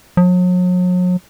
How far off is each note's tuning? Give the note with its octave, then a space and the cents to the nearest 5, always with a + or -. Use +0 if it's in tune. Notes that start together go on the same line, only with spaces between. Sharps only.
F#3 -40